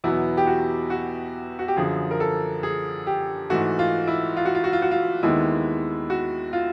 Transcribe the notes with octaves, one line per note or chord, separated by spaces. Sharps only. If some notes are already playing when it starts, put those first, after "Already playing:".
E2 B2 F#3 B3 E4
G4
F#4
F#4
F#4
G4
F#2 D3 F3 G#4
A#4
A4
G#4
G4
G#2 E3 A3 F#4
F4
E4
F4
F#4
F4
F#4
F4
F#4
F4
D#2 D#3 G#3 B3 E4
F#4
F4